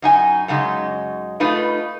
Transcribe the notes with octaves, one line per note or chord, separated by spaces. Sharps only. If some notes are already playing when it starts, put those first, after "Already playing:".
F#2 D#4 G#5
F#2 C#3 G#3 D#4
A3 D#4 F4 B4 D#5